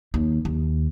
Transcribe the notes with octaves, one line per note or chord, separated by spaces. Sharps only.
D#2
D#2